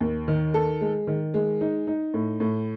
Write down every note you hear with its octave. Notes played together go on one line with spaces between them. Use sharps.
D#2
D#3
A4
G#3
D#3
G#3
D#4
D#4
A2
A2